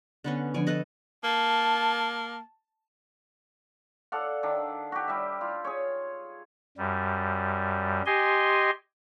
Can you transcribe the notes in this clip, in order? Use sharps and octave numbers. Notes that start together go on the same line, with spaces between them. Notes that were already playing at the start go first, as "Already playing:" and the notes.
D3 B3 C#4
D3 F3 D4 C#5 D5 G#5
A4 B4 D#5
A#3 A5
A4 D5 F5 F#5
D#3 D4
F#4 G4
G3 E5
F4
G#4 C#5
F#2 G3
G4 D#5 G#5 C6